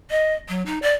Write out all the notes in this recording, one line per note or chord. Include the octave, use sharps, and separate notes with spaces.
D#5
F#3
D#4
D5